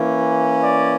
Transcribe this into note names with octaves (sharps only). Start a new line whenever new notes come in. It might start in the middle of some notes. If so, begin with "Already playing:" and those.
Already playing: E3 A#3 C#4
D5